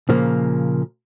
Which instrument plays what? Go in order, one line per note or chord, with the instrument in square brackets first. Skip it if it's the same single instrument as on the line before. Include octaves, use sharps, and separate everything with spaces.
[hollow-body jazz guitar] A#2 C#3 F3 A#3